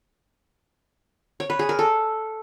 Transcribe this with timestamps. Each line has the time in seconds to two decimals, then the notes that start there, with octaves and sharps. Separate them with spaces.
1.40 C#5
1.50 B4
1.59 G#4
1.69 A#4
1.79 A4